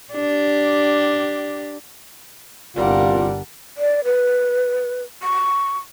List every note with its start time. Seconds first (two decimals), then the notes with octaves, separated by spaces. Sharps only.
0.13 D4 G4
2.76 G1 C2 G3 D4 F4 A#4 F#5
3.77 D5
4.04 B4
5.23 C#6